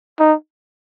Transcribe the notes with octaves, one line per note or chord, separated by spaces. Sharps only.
D#4